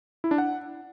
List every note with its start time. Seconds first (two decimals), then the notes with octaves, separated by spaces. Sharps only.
0.24 E4
0.31 D4
0.38 F#5